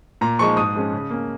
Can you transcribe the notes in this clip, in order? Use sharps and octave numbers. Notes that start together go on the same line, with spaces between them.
A#2 A#5
F3 G#3 D#4 C#6
G#2 D#6
F3 G#3 C#4
C#3
A#3 C#4